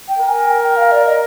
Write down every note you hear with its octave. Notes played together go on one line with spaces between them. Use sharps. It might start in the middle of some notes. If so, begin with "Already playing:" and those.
G5
A#4
G#5
G5
G5
F5
D5
D#5